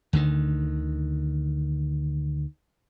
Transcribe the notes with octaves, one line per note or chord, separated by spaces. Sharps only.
D2 D3 D#3